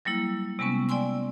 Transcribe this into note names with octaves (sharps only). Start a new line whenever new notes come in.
F#3 G3 A#3 E4
C3 G3 G#3 B3 C#4
D5 G5 G#5 C6 E6